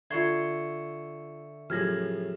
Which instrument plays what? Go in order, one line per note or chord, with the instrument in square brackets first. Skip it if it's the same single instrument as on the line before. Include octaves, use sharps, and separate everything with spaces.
[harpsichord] D3 C6 [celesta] F4 G#6 [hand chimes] E5 C#6 C#7
[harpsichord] F#2 A2 C#3 [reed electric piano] F3 G4 [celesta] F6 G#6 A#6